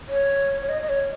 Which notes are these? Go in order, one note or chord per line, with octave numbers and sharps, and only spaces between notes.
C#5
C#5
D#5
D#5
C#5